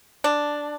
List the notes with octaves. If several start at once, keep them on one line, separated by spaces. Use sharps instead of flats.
D4